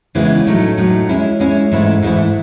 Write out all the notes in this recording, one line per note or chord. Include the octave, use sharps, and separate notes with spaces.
C#3 E3 G#3 B3 E4
A2 F#3 A3 D#4
A2 F#3 A3 D#4
G#3 C#4 E4
G#3 C#4 E4
G#2 E3 A3 E4
G#2 E3 A3 E4